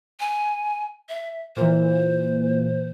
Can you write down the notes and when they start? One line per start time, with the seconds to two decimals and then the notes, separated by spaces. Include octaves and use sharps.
0.20 G#5
1.09 E5
1.56 A#2 E3 C5